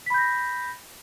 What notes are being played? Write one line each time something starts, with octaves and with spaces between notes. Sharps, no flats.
B5 G6 A#6 B6